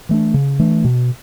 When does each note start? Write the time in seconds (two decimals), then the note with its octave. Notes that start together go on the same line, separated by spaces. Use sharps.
0.09 E3 A3 D4
0.34 C#3
0.59 E3 A3 D4
0.85 B2